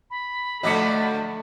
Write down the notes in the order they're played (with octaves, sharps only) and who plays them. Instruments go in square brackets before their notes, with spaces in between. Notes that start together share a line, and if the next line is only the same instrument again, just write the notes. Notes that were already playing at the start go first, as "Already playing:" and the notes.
[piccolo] B5
[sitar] D3 F3 F#3 [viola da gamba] A3 [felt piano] D#5 D6 C#7